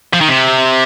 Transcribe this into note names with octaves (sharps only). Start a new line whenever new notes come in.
F3
D#3
C3